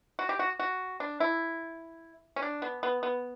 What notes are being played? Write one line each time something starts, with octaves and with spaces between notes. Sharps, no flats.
F#4
G4
F#4
F#4
D4
E4
C#4
D4
B3
B3
B3